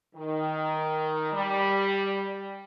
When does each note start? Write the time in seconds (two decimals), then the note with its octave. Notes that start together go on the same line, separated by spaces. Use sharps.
0.16 D#3
1.33 G3